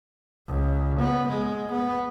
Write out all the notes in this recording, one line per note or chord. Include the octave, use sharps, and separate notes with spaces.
C#2
B3
G#3
B3